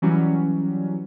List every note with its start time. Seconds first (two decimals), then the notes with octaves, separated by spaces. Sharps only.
0.02 E3 F#3 G3 C#4